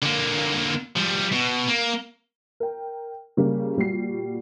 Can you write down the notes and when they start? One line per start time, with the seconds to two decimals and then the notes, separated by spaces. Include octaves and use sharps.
0.02 D3 A#3
0.97 F3 G3
1.32 B2
1.68 A#3
2.60 A#4 G5
3.37 C#3 G3 A#3
3.77 A#2 G3 F#4 C7